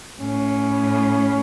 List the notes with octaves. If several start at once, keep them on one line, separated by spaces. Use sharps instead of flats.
A2 C#4